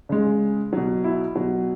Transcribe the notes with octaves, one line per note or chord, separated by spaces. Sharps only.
C#3 G#3
B2 F#3
E4
B2 F#3